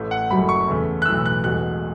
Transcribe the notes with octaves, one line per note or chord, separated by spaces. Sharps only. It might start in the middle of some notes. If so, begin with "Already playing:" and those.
Already playing: A1 A2 A3
F#5
F#1 F#2 F#3 A3 B5
C#6
E2 C#3 A3
F#6
B1 A2 E3 A3 E6
F#6
E1 E2 B2 A3 F#6